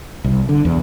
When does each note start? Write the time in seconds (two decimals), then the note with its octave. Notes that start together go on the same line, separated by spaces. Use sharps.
0.24 C2
0.49 D3
0.65 E2